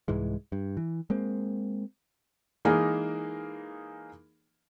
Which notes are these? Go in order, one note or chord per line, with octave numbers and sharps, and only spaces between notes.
C2 G#2 E3 G#3
G2
E3
G#3 A#3 C4
E3 G#3 A#3 D#4 G#4 A#4